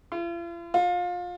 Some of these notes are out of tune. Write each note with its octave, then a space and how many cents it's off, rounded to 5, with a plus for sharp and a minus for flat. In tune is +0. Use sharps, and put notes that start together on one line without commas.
F4 -45
F4 +25